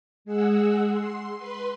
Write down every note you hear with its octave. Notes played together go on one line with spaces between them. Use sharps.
G#3 G#4 F#5 E6
C6
B4 C6